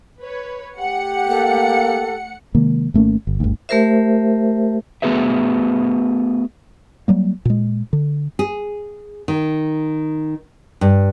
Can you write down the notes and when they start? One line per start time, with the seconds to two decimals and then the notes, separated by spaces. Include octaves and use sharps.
0.20 B4 C#5
0.78 A3 G4 F#5 C#7
1.28 A#3 A4
2.55 C3 D#3 G#3 A#3
2.94 G#1 A3 A#3 C#4
3.27 G1
3.40 G1 D2
3.69 A3 G4 A#4 C5 E5
5.02 A3 B3 F#4 G#4 B4 E5
7.08 F#3 G3 A#3
7.45 A#2 G#3
7.93 D3
8.39 G#4
9.28 D#3
10.81 G2